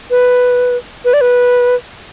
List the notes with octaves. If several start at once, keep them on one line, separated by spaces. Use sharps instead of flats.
B4
B4
D5
B4